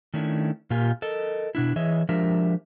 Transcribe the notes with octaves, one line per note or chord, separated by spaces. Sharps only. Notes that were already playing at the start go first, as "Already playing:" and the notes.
D#3 A3 C#4 D4 E4
A#2 A#3 F4 G4 G#5
A4 A#4 D#5
B2 D4 E4
E3 G#4 C#5 D#5 E5
F3 G#3 D4 G4 A#4 E5